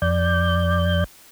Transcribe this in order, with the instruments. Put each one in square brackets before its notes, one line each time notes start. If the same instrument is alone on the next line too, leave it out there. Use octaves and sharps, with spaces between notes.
[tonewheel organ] F2 D5 G6